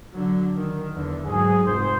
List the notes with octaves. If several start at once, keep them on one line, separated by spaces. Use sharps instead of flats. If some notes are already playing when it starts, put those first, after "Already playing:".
D3 F#3
D#3
E2 D3
G#2 F#3 G#4
F1 G#2 C5